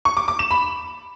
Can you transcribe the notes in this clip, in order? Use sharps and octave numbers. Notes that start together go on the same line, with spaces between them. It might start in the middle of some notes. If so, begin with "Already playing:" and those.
C#6
D6
D6
E7
B5